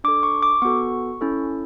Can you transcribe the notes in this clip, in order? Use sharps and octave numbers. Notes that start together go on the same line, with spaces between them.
D4 A4 D6
C#6
D6
B3 F#4 A4 C#6
C#4 E4 A4